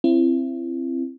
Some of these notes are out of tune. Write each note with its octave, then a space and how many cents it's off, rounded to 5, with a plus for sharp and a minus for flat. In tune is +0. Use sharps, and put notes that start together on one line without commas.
C4 +15 E4 +30